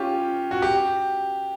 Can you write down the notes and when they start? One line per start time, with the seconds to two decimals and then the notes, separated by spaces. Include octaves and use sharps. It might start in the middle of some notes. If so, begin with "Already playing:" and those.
Already playing: C#4 F4 G4
0.51 F#4
0.62 G4